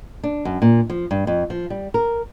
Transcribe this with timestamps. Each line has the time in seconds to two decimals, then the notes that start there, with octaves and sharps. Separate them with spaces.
0.24 D4
0.45 F#2
0.62 A#2
0.90 F3
1.11 G2
1.27 F2
1.50 F3
1.70 G3
1.94 A#4